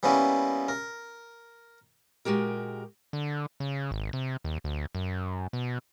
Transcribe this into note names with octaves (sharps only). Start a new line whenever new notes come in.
G3 A#3 B3 C#4 E4
A#4
A#2 G#3 F#4 G4 A#4
D3
C#3
G#1
C3
D#2
D2
F#2
B2